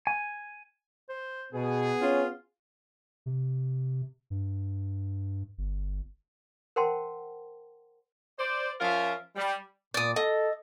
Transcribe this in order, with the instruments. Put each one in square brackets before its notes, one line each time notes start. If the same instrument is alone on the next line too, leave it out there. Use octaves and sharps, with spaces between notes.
[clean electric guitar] G#5
[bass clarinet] C5
[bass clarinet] B2 [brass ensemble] B3 G#4
[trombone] C#4 [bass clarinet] F4
[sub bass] C3
G2
G1
[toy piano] A#4 C5 F#5 G5 A5 C6
[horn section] C5 D5
F3 C#4 F4 A#4 E5 F5
G3
[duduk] A#2 [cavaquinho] D5 D#6
[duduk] A4 [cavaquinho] D#5